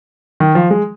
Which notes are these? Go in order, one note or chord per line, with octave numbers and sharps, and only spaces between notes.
D#3
F3
G#3